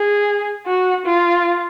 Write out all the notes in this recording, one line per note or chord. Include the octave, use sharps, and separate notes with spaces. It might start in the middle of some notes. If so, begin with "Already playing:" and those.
Already playing: G#4
F#4
F4